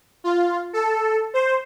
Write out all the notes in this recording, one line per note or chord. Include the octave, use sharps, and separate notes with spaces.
F4
A4
C5